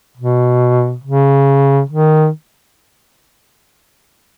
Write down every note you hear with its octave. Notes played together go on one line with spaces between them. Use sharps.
B2
C#3
D#3